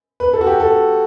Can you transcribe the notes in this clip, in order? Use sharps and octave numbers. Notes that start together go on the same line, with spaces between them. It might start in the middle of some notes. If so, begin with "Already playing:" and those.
B4
A4
F#4
G4
A4